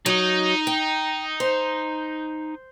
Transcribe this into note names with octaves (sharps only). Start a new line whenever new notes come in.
F#3 D#4 D#5
G5
C5